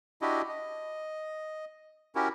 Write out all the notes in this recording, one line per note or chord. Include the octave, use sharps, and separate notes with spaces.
D4 E4 F#4 G4 D#5
D#5
C#4 E4 F#4 G4 A#4